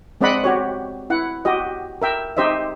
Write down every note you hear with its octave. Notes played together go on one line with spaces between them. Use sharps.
G#3 C4 D5 D#5 F#5 B5
F#4 G4 C#5
E4 F#5
F#4 G4 D#5
A#4 E5 G5
D#4 G4 C5 D#5 E5